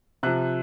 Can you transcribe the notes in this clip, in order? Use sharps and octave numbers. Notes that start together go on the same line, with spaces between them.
C3 F3 F#6